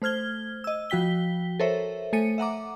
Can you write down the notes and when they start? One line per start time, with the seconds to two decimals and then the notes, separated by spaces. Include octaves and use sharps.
0.02 A3 C5 F6 G#6 G7
0.64 D#5 E6
0.90 F3 F#4 G5 B6 G7
1.60 A4 A#4 C5 C#5 E5
2.13 A3 A4 G#5 C#7 D#7
2.38 E5 F#5 A#5 D6